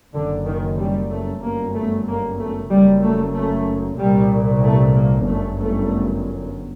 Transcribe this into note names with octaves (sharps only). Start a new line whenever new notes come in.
F#1 F#2 D3
D#3
G3
A3
G1 F#2 A#3
A3
A#3
A3
F#1 F#2 G3
A3
A3
C2 A#2 G3
A3
A#3
G1 F#2 A3
A3